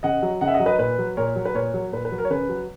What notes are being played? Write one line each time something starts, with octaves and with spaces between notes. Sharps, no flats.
C#3 D#5 F#5
F#3
C#3 D#5 F#5
E5
D#5 F#5
F#3
B4 D#5
A#2 B4
F#3
A#2 A#4 C#5
F#3
B4
A#2 A#4 C#5
F#3
A#2 B4
B4
F#3
A#4
C#5
C#3 B4
F#3